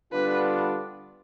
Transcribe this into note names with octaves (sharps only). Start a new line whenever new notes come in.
D3 G3 B3 D4 F4 B4